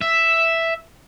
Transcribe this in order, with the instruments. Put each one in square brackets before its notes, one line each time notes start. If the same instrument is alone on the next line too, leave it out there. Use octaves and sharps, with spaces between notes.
[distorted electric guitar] E5